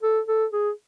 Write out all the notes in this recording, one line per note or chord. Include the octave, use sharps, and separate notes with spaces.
A4
A4
G#4